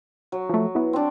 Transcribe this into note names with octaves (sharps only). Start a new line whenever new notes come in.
F#3
F3 A3
B3 E4
C4 D4